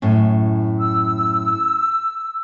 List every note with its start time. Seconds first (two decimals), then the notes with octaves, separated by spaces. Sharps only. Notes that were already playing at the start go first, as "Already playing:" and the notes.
0.02 F#2 A2 C#4
0.79 E6